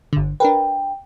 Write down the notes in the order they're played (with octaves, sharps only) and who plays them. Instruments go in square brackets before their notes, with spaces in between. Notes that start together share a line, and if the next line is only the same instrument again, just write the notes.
[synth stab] G1 D3
[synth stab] D4 A#4 B4 [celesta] G5